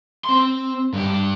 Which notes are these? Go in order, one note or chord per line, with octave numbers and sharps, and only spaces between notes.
C4 C6
G2 G4